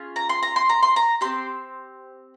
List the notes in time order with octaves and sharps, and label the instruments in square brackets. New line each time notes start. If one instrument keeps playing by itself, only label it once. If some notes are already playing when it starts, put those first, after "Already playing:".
Already playing: [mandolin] C#4 F4 G#4
A#5
C6
A#5
C6
A#5
C6
A#5
C4 G4 C6